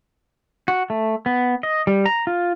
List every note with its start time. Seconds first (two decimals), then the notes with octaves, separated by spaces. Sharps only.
0.68 F#4
0.90 A3
1.26 B3
1.63 D#5
1.87 G3
2.06 A#5
2.27 F4